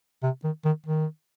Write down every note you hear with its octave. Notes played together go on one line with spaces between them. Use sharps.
C3
D#3
D#3
D#3